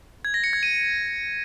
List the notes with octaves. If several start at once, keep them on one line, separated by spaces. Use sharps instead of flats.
G#6
A#6
C#7
G#6
D#7